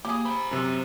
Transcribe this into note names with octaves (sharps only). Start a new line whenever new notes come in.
A#3 G4 G#4
C5 A#5 B5
F#2 C3